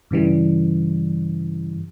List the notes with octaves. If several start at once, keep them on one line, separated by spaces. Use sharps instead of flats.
G2 C#3 E3 G3